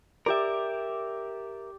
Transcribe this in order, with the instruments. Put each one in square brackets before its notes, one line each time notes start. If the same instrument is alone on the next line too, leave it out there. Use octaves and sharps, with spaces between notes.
[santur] G4 D5 [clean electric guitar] A#4 E5